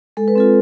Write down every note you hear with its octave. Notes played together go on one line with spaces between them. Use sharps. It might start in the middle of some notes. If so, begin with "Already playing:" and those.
G#3 A4
B4
C4 F4 A4